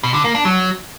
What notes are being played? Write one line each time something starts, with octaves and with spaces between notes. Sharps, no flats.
B2
D3
A#3
D4
F#3